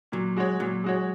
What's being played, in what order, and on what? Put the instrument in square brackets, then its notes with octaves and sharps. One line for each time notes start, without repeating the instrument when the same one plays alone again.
[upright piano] A#2 [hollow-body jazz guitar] F#3
[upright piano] G#3 F#4 C#5
[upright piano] A#2 [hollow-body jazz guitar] F#3
[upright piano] G#3 F#4 C#5